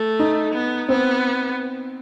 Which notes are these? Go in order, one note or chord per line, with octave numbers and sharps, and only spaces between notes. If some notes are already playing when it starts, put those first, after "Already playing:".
Already playing: A3
D#4
B3
B3 C4